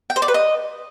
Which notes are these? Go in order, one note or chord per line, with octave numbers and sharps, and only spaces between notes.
G5
C5
D5
B4
D#5